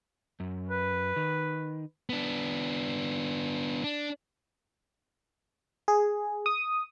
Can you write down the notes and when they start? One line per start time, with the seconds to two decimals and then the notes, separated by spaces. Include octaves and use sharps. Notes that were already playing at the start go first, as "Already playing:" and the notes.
0.40 F#2
0.70 B4
1.16 D#3
2.10 B3 D4
3.84 D4
5.88 G#4
6.46 D#6